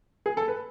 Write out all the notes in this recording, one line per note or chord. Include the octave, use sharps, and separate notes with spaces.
G#4
A4
B4